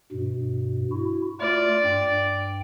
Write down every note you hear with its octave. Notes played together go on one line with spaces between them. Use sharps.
G2 B2
E4 F#4
A3 F4 D5 F6
G2 G5